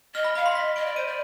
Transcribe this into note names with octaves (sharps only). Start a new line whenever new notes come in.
D#5 F6
B5
F5 B5
C6
F5
D#5 B6
D#5 D7
D5
C5 D#7
D5